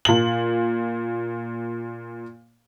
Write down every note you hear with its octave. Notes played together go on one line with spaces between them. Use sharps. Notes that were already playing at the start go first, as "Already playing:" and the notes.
A#2 F#7